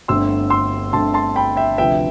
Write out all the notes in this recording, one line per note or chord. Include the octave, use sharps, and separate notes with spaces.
G1 G2 D3 A3 C4 C6 E6
C6 E6
G1 G2 D3 A3 C4 A5 C6
A5 C6
G5 B5
E5 G5
D2 C3 F3 B3 E5 G5